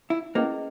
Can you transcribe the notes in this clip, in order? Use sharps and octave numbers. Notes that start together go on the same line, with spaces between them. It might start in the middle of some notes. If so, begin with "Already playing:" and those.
E4
A#3 C#4 E4 G#4 B4 D#5